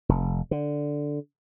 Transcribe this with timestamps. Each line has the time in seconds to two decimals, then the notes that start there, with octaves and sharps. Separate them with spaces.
0.09 F1
0.51 D3